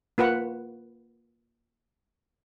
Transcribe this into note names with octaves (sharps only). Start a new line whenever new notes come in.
A#3 F4 B4 F#5